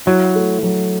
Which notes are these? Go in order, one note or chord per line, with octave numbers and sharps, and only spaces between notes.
F#3 E4
A3
F#3